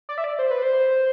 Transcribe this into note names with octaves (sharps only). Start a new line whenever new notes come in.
D5
E5
D5
C5
B4
C5